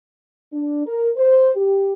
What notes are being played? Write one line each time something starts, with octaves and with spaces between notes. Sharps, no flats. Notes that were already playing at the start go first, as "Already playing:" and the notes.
D4
A#4
C5
G4